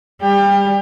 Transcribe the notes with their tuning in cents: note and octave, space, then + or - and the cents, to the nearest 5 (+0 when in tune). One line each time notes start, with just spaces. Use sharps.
G3 +15 G4 +30